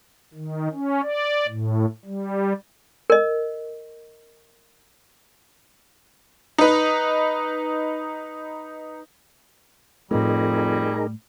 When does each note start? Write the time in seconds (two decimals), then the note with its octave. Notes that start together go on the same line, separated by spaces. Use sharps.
0.34 D#3
0.73 C#4
1.03 D5
1.48 A2
2.05 G3
3.10 A#4 D#5
6.58 D#4 B4
10.11 F2 A2 G3 A3 D#4 G#4 A#4